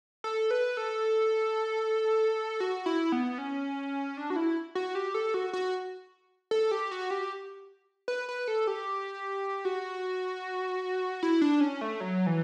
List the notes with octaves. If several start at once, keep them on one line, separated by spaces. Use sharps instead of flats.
A4
B4
A4
F#4
E4
B3
C#4
D4
F#4
E4
F#4
G4
A4
F#4
F#4
A4
G4
F#4
G4
B4
B4
A4
G4
F#4
E4
D4
C#4
A3
F#3
E3